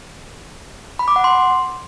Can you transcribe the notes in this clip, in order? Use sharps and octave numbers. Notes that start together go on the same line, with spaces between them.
B5
D6
F#5
C6